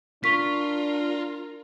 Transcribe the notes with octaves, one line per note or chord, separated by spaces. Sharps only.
D4 F4 A#4 C#6 B6